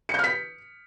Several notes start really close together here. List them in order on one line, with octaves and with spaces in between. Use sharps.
C#7 G6 F6 B6